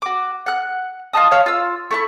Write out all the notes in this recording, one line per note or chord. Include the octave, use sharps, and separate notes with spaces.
F#4 D6
F#5 F#6
F4 D#5 A5 D#6
C#5 F5
F4 E6
A3 E4 C#6